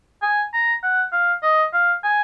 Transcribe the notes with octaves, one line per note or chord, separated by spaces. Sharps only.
G#5
A#5
F#5
F5
D#5
F5
G#5